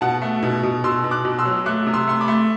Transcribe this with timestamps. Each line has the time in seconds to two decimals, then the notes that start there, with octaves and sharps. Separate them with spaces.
0.01 B2 F#5 A5
0.22 A3
0.43 B2
0.63 B2
0.84 B2 C6 E6
1.04 B2
1.11 D6 F#6
1.25 B2
1.39 C6 E6
1.45 F#3
1.66 A3 D6 F#6
1.87 C3
1.93 C6 E6
2.07 A3 C6
2.21 B5 D6
2.28 A3